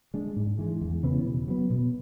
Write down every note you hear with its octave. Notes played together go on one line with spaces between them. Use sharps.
G#3 D4
G#2
E3 G#3
E2
C#3 E3 B3
B2
F#3 B3
B2